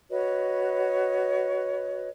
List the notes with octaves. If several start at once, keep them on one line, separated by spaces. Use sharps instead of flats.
F#4 B4 C#5 D#5